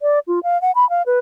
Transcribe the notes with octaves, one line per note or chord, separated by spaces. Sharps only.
D5
F4
F5
F#5
B5
F5
B4